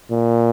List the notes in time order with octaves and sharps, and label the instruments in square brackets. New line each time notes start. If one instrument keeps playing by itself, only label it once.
[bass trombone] A#2